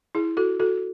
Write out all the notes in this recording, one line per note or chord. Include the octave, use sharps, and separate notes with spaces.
E4 G#4
F#4 A4
F#4 A4